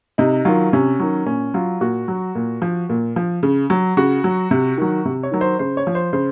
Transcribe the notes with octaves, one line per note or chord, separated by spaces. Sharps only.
C3 D#4
D#3 F#3 F4
C3 C#4
D#3 F#3
A#2 C#4
F#3 F4
A#2 F#4
F#3
A#2
F3
A#2
F3
C#3
F#3
C#3 F#4
F#3
C3
D#3 F#3
C3
C#5
D#3 F#3
C5
C#3 C5
C#5
F3
C5
C#3 C5